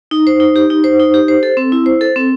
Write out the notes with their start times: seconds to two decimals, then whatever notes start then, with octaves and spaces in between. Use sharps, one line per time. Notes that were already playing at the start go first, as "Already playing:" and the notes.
0.11 D#4
0.27 C5
0.40 D#4
0.56 G4
0.70 D#4
0.84 C5
1.00 D#4
1.14 G4
1.28 C5
1.43 A4
1.57 C4
1.72 E4
1.86 C5
2.01 A4
2.16 C4